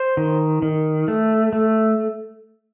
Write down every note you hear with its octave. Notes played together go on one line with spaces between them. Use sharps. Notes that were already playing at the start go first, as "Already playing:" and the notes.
Already playing: C5
D#3
D#3
A3
A3